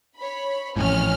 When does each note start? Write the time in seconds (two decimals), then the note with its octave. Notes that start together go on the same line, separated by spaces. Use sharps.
0.17 C#5 B5
0.76 A1 F2 A2 C#4 F6